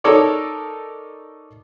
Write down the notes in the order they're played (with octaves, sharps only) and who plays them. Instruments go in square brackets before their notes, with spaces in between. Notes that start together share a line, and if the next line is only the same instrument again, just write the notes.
[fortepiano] D#4 A4 A#4 C#5 D5